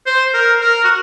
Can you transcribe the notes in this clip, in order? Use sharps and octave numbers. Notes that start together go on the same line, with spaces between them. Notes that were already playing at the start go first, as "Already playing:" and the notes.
C5
A#4
A#4
F#4